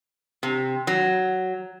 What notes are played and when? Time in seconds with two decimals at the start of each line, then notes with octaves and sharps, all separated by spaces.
0.43 C3
0.87 F#3